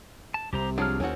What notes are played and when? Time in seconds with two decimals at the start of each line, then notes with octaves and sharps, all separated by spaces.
0.34 A5
0.53 C2 C3 G4 C5 A#5
0.78 F3 F#3 D4 G#4 F6
1.00 F#1 D#2 C#4 F#4 A#4 C5